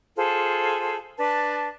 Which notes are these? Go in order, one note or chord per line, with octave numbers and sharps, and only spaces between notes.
F4 G#4 A4 C5
D4 B4 A5